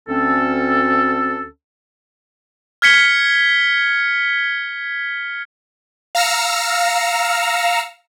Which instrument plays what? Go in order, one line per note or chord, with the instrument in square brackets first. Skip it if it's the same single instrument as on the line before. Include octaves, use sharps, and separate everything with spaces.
[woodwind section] D2 C4 C#4 A4
[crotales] F6 G#6 B6 C#7 G7
[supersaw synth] F5 A#5 E6 F6 A#6 C#7